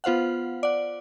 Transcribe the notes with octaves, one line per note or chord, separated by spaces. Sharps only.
B3 F4 C5 F5 F#5
D5 F#5